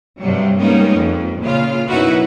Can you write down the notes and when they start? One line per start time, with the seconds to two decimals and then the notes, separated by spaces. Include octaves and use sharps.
0.21 G2 C3 F#3 G3
0.58 G3 G#3 A#3 B3 C#4 D#4
0.96 F2
1.42 A#2 C#3 F4 F5
1.89 F#2 B2 D#4 E4 F#4 B4